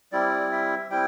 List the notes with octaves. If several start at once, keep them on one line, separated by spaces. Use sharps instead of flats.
G3 C4 E4 D5
E5
G3 C4 E4 G5